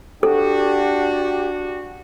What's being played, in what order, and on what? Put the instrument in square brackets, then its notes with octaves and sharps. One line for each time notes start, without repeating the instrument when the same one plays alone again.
[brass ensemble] D4 F#4 [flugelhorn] G4 [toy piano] A4